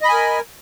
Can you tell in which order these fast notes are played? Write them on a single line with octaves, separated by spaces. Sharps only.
D#5 B5 G#5 A#4